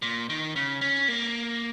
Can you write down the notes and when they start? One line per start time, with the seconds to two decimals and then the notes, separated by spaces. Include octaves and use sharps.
0.02 A#2
0.29 D#3
0.56 C#3
0.81 C#4
1.08 A#3